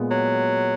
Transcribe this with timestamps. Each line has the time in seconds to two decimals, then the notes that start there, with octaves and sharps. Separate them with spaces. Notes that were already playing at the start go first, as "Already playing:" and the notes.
Already playing: A#2 G#3 B3
0.11 F#3